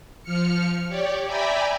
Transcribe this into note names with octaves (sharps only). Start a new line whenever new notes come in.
F3 F6 C#7
G4 C#5 D5
D5 E5 G5 G#5 A#5 B5